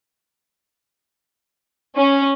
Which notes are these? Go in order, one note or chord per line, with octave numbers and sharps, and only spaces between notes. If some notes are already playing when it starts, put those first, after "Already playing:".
C#4